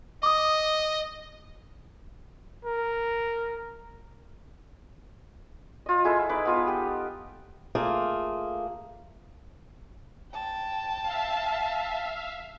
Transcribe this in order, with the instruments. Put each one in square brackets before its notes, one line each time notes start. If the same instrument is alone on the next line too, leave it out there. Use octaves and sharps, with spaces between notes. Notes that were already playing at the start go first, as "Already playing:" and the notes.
[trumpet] D#5 [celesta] D6 D#6
[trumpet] A#4
[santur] F4 D#5
G#3 E4 A4 A#5
D#4 B4 D6
B3 F4 D#6
G4
[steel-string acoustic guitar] A3 A#3 F4 G#4
[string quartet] G5 A5
[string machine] E5 F5